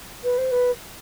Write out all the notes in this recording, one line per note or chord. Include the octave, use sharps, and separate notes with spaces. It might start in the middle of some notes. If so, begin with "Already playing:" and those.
B4
C5
B4